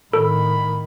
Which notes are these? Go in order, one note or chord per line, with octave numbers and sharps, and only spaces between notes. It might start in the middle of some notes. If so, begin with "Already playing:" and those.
A2 D#3 A4 B5